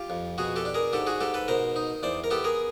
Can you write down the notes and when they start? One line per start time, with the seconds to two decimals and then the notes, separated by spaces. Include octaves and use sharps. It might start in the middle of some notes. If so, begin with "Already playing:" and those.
Already playing: F4 G4
0.10 F2
0.38 B2 F#4 G#4
0.56 G4 A4
0.65 D4
0.74 G#4 A#4
0.93 G#2 G4 A4
1.07 F#4 G#4
1.21 G#2 G4 A4
1.34 A4 B4
1.48 B2 A#4 C5
1.76 D#4
2.03 E2 C5 D5
2.24 A#4
2.31 B3 G4 A4
2.44 G#4 A#4